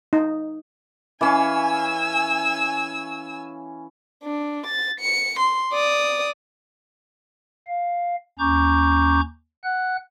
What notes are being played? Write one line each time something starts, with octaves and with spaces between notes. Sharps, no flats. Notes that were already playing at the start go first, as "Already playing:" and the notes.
D#4
E3 C#4 F5 G#5 E6
D4
A6
C#7
C6
D5 D#6
F5
D#2 C#4 A#5 C#6 D6 G6
F#5 F#6